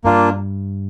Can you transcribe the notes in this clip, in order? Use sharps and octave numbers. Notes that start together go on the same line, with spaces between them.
G2 A#3 D4 F4